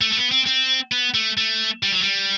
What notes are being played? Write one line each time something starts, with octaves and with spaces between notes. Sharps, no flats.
A3
A3
B3
C4
C4
B3
A3
A3
G3
F#3
G3